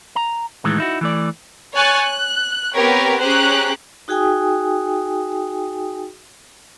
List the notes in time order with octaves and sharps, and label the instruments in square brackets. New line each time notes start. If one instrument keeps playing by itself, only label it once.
[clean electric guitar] A#5
A2 D#3 E3 G#3
D#4 E4 F#4
E3 A3 D5
[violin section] C#5 G#5 C#6 F#6 A6
F#6
B3 C4 G4 A#4 B4 C#5
C#4 G4 G#4 C5 A#5 F#6
[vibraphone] D#4 F#4 G#4 G5 G#5 D#6